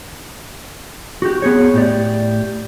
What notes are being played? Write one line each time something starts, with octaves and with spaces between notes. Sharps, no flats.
F#4 G4
B3 G#4 C#5
A2 G4 D5